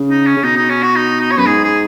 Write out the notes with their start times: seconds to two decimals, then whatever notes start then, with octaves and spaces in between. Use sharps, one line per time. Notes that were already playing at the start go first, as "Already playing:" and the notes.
Already playing: C#3
0.10 D#4
0.26 C#4
0.37 C#3
0.43 B2 D#4
0.56 D#4
0.69 C#4
0.83 F#4
0.96 D#4
1.20 D#4
1.31 C#5
1.38 F#2 B4
1.46 G#2 G#4
1.64 G#4